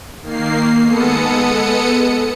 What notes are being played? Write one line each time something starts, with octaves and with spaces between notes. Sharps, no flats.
D#3 A#3 C7
G#3 B3 A4 D#6 C#7